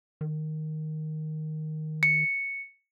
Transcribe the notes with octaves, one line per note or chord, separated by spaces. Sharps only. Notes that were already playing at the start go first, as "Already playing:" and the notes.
D#3
C#7